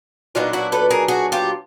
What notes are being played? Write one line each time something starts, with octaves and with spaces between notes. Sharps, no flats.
A#2 F#3 B3 D4 D#4 F4
E4 F#4
A4 B4
G#4 A#4
F#4 G#4
F4 G4